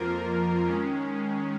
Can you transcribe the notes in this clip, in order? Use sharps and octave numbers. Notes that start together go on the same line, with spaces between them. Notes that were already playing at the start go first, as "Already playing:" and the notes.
Already playing: F2 F3 A#3 F4 A#4
D#3 G#3 C#4